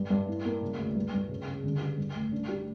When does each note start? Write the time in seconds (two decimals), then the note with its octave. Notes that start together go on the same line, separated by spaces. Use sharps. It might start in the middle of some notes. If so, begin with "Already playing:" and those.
Already playing: G2
0.10 G2
0.28 A2
0.45 A#3
0.62 C#3
0.78 D2
0.95 G2
1.13 G2
1.29 C#3
1.47 C#3
1.64 D3
1.81 G3
1.97 G2
2.15 A1
2.32 D4
2.49 G3